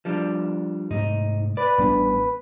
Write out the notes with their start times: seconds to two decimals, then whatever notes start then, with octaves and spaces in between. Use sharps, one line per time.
0.05 F3 G3 D4
0.91 G#2 C3 A3 D#4
1.57 B4 D5
1.78 A1 G2 B3 D4